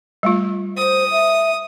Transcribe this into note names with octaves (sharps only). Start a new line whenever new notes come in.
G3 A3 F4
C5 D#6
E5